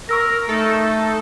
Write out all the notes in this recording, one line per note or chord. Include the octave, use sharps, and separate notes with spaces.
A#4 C#6 E6 A#6
A3 D#4 A4